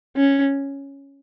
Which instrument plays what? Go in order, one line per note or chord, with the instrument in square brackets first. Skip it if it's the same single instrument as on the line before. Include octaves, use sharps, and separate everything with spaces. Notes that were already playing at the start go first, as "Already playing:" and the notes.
[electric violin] C#4